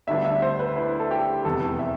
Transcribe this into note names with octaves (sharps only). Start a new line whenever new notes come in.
D2 D3 G3 B3 D4 E5
E5
C5
B4
E4
A4
G4
F1 E2 C3 E3 A4
E5